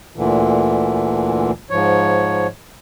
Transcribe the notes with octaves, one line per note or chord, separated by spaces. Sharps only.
D2 A#2 D3 E3
G#2 F3 C#5